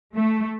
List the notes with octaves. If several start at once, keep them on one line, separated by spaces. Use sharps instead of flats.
A3